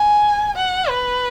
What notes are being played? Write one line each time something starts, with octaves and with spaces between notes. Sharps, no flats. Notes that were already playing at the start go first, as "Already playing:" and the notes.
Already playing: G#5
F#5
B4